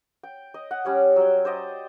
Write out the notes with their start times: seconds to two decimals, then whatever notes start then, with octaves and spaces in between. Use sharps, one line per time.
0.23 G5
0.54 D#5
0.71 F#5
0.85 G3 C#4 F#5
1.16 F#3 G5
1.45 C5 D5 D#5 G5